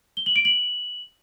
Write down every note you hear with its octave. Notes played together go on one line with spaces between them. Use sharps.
G7
F#7
D7
F#7